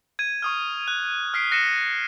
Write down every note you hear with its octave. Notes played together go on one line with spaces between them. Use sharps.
G#6 D#7
C#6 D#6 F6
F#6
F6 B6 C7 D7
F#6 A#6 C#7 D#7 E7